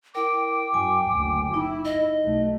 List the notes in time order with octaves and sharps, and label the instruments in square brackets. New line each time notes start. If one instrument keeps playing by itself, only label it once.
[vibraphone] E4 A#4 [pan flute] G5 [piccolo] D6
[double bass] F#2 [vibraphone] G#5
[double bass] F#1 D2
[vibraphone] D#4 [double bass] E4
[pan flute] D#5
[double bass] B1 A3